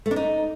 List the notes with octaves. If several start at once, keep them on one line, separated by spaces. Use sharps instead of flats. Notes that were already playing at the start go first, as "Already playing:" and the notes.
A3
D4
D#4